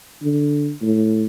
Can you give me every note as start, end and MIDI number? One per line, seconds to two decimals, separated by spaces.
0.23 0.71 50
0.82 1.26 45